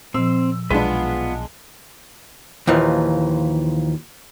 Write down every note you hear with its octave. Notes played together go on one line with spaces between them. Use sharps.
A#2 F3 C4 E6
B1 G#3 B3 D4 F4 B4
D#2 A#2 E3 F3